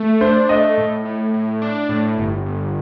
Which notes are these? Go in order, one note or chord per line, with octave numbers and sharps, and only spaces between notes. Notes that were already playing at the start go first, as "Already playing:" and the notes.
Already playing: A3
D4 C5
A3 D#5
A2
A2
A2
D4
A2
G1
G1